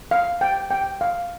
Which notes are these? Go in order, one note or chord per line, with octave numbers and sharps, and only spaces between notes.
F5
G5
G5
F5